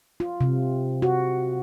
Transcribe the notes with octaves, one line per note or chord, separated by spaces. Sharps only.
F4
C3
F#4